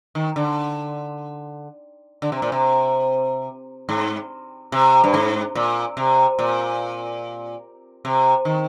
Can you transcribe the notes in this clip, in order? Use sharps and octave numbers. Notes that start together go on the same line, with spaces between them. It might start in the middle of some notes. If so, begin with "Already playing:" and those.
D#3
D3
D3
C3
A#2
C3
G#2
C3
G2
G#2
A#2
C3
A#2
C3
D#3